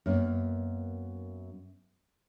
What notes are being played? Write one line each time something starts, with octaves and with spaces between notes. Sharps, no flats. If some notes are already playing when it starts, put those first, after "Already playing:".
F#2 A#3 B3